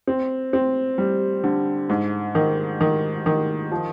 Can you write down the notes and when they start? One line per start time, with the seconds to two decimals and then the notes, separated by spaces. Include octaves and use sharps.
0.07 C4
0.53 C4
0.98 G3
1.44 D3
1.89 G#2
2.35 D#3
2.81 D#3
3.26 D#3
3.71 F3